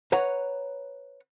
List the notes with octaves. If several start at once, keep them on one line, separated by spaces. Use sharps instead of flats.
B4 C#5 F#5 A#5